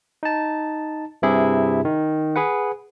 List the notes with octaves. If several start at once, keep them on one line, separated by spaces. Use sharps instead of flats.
D#4 A5
G2 C3 E4 G#4
D#3
G#4 B4 F#5